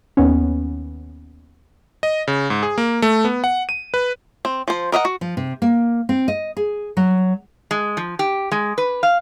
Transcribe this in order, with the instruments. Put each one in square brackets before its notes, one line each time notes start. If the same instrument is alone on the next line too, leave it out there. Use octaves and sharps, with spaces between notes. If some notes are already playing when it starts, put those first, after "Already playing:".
[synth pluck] D#2 B3 C#4
[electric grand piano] D#5
C#3
G#2
G#4
A#3
A3
B3
F#5
D#7
B4
[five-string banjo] C4
F3 C5
A#4 D#5 E5 F#5
F#4
[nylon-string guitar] F3
C3
A#3
C4
D#5
G#4
F#3
[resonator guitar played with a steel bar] G#3
F3
G4
G#3
B4
F5